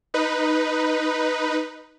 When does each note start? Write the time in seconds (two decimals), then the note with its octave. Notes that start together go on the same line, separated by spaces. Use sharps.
0.14 D#4 B4